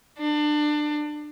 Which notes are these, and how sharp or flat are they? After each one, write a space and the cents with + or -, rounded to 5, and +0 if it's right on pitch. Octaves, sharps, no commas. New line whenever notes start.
D4 +25